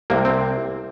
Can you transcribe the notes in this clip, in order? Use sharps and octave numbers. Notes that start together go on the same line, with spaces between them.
C2 C3 A#3
C4